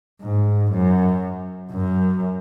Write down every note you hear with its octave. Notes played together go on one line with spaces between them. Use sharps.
G#2
F#2
F#2